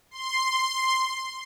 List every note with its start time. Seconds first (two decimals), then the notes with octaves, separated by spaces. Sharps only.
0.11 C6